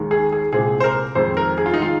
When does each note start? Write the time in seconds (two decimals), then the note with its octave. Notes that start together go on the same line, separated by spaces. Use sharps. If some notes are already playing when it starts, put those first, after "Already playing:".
Already playing: D#2 D#3 G#3
0.11 G#4
0.33 G#4
0.53 C2 A#2 G#3 C4 G#4
0.80 C5
0.84 A#4
1.15 F2 D#3 G#3 C4 C5
1.37 A#4
1.58 G#4
1.66 F4
1.74 D#4
1.79 D#3 G#3 F4